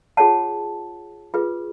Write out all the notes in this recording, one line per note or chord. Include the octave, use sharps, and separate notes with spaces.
F4 G#4 C#5 F#5 A5
F4 G#4 B4